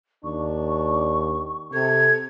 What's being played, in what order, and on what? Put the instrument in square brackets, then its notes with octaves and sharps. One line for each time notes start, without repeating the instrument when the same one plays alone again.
[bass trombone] D#2 [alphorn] D4 [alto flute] C#6
[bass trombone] C3 [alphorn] A4 [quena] G#6